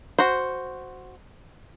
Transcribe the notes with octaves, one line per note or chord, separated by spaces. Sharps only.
F#4 C5